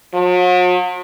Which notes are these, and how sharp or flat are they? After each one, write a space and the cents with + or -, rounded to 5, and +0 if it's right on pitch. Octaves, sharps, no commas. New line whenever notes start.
F#3 -45